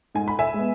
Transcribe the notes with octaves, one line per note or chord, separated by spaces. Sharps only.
G#2 G#5
B5
E5 G#5
G#3 B3